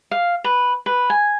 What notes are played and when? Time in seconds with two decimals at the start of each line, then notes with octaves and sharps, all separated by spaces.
0.11 F5
0.44 B4
0.86 B4
1.10 G#5